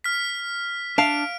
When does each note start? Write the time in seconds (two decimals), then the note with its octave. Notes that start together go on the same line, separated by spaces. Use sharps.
0.04 F6 B6
0.98 D4 F5 A5 D7